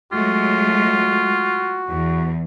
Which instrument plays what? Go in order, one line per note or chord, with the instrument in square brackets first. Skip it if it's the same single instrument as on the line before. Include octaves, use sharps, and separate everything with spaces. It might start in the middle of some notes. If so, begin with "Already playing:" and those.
[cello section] F#3 G#3 A3 [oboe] F4 [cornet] F#4
[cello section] E2